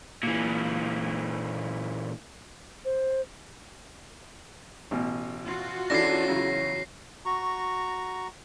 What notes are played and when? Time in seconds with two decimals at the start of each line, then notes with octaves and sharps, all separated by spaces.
0.23 A#2 E3
2.85 C5
4.91 A1 B2
5.45 F4 F#4
5.90 E2 C#4 D4 E4 A4 A#6 C7
6.28 C#3 F#3 E4
7.25 F#4 A#5 C#6